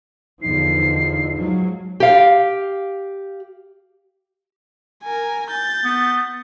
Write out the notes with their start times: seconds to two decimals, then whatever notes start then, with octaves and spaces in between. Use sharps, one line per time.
0.42 E2 D3 F3 D#4 C7
1.35 F3 F#3 G#3
2.00 G4 F5
5.04 A#4 G#5
5.51 G6 A6
5.84 B3